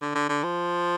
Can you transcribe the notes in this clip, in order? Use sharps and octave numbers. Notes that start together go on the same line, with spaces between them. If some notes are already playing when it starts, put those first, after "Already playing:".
D3
D3
D3
F3